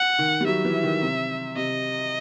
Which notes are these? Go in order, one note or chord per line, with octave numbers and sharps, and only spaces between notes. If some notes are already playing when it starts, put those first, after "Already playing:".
Already playing: F#5
D#3
G3
F#3 E5
E3
D#3
C3
C3 D#5